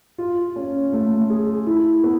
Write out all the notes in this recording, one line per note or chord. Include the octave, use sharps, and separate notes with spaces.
F4
C#4
A3
G#4
E4
B3